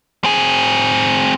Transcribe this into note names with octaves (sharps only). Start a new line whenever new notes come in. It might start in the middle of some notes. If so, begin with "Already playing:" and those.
C4 G#4